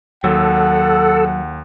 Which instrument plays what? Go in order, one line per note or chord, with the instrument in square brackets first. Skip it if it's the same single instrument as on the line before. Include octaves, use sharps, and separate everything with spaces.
[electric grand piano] D#2 [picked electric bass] F#3 [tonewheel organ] A4 [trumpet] F#5